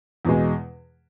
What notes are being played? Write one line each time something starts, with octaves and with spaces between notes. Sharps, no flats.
E2 B2 G#3